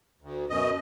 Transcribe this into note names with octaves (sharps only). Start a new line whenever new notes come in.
D2
F#2 B2 D#5